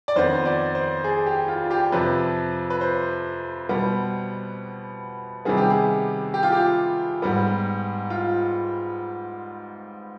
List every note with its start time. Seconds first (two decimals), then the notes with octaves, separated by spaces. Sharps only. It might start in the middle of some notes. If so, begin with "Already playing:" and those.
0.08 D5
0.16 F2 D#3 B3 C5
0.45 D5
0.75 C5
1.04 G#4
1.26 G4
1.48 F4
1.71 G4
1.92 F2 C3 F3 B4
2.70 B4
2.81 C5
3.69 B2 G3 B3
5.45 C3 D#3 G3 B3 G#4
5.57 G4
5.70 G#4
6.34 G4
6.43 F4
6.52 G4
7.22 G#2 G3 B3
8.10 F4